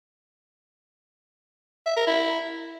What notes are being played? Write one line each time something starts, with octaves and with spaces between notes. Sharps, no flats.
E5
A#4
E4